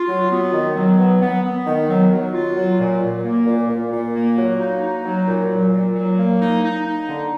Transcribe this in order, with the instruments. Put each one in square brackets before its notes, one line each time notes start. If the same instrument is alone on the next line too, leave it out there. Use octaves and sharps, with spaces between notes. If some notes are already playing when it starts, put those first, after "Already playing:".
Already playing: [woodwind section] F4
F#3
B3
D#3
F#3
B3
B3
B3
D#3
F#3
F#3
F4
F#3
A#2
A#2
A#3
A#2
A#2
A#2
A#3
F#3
D#4
D#4
F#3
A#2
F#3
A#2
F#3
A#3
D#4
D#4
D#4
D3